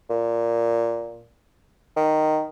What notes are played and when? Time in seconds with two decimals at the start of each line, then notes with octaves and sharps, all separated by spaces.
0.10 A#2
1.97 D#3